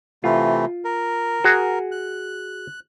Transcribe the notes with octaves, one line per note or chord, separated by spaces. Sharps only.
C3 E3 A3 F4
A#4
F#4 G#4
F#6